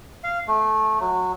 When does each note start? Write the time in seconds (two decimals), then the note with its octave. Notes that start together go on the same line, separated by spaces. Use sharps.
0.24 F5
0.48 A3
1.00 F#3